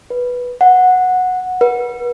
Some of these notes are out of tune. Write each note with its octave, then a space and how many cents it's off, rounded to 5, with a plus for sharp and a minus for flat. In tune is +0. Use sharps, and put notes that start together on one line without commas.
B4 -5
F#5 -10
B4 -35